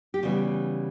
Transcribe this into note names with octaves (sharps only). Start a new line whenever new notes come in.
G4
C#3 E3 G3 B3 F#4